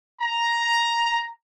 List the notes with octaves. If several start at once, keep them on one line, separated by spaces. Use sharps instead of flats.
A#5